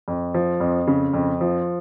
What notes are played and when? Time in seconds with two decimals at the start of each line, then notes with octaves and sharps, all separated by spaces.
0.08 F2
0.34 F3
0.60 F2
0.87 C#3
1.14 F2
1.41 F3